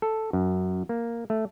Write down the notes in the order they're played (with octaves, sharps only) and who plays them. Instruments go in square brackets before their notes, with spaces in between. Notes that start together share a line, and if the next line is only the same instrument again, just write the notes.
[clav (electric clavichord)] A4
F#2
A#3
A3